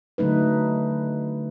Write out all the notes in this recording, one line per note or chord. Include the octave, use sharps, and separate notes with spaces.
D3 F#3 A3 D#4 B4